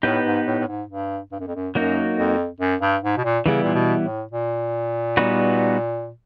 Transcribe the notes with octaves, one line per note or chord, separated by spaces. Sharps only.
A2 B3 D#4 G4 B4
G#2
A2
A2
G#2
G2
G2
F#2
F2
F#2
F#2 F#3 A#3 D#4 F#4
F2
F#2
G2
G#2
B2
A#2
C#3 E3 G3 B3 E4
A#2
B2
A2
A#2
G3 B3 D#4 F#4 B4